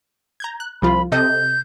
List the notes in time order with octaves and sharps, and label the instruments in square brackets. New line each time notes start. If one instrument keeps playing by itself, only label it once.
[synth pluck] A#5 G6 G#6
F#6
[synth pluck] C2 F3 F4 [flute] B5
[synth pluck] C3 A4 D#5 [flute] G6